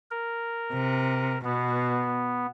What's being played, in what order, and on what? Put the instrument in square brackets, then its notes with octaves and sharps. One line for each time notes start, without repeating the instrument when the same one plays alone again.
[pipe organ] A#4
[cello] C3
[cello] B2 [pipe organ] B3